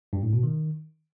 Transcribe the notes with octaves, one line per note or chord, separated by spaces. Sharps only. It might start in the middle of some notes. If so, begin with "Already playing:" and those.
G2
A2
B2
D#3